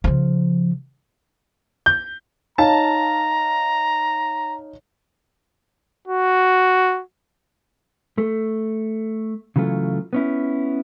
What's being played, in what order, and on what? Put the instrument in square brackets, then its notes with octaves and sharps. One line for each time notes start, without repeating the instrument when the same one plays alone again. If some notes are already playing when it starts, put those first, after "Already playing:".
[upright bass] C#3 F3
[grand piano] G6
[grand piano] D#4 C#5 F5 [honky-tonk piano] A5 [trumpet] A#5
[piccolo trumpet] F#4
[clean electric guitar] A3
C#3 E3 F#3 A3 F4
B3 C#4 E4